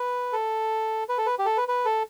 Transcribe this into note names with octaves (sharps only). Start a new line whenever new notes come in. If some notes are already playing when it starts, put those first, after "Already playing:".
Already playing: B4
A4
B4
A4
B4
G4
A4
B4
B4
A4